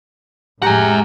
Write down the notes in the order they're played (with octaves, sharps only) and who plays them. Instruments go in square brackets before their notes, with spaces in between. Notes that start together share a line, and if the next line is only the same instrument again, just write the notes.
[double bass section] A2 G#3 [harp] G4 A#5 [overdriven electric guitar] F#5 G#5